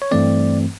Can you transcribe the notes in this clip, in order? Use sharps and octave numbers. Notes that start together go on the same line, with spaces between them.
C#5
G2 E3 A3 C4 D5